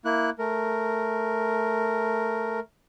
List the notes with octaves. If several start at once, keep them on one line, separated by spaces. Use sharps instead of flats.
A#3 E4 F#6
A3 A#4